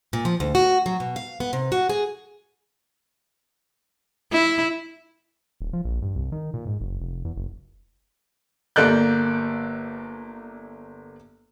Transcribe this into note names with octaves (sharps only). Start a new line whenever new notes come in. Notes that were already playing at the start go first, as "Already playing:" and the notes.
A#2
F3
D2
F#4
F#3
B2
F5
B3
C3
F#4
G#4
E4
D#1
F3
A#1
G2
C2
D#3
A#2
G#2
F#1
F1
E2
F#1
G1 A#3 A4 D5 F#6 G6